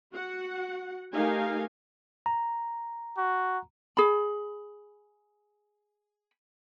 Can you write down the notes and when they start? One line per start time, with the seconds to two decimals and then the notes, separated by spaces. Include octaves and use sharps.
0.13 F#4 F#5
1.13 A3 D#4 G4 A#4 F5 G#5
2.26 A#5
3.17 F#4
3.97 G#4 B5